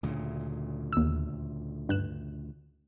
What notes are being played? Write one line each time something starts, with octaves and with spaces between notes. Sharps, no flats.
D2 A#2 C#3
D#2 E6
G2 F#6 E7